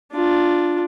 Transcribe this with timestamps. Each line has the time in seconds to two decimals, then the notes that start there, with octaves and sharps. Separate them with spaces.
0.13 D4 F4